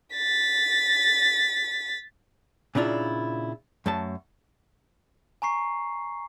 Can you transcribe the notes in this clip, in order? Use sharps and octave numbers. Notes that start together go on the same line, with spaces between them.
A6 B6
A#2 C#3 D4 E4 F4
F#2 A3 A5
G#5 A#5 C#6 C7